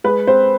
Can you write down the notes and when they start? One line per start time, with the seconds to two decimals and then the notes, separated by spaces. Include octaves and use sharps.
0.04 G#3 B4
0.27 C4 C5